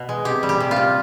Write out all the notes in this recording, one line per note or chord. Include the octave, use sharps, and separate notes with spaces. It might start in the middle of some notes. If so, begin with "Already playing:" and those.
Already playing: B2
G#3
C3 G4
G3
G4
C3
F4
C3